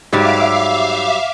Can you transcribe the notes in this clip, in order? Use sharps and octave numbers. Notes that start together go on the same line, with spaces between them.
G#2 F#3 G3 G4 E5 F5 D6